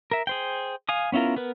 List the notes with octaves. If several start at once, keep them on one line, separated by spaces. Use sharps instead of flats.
A#4 E5
G#4 C5 G5
F5 G#5 D#6
B3 C#4 E4 F4 A#4
B3 A#4 B4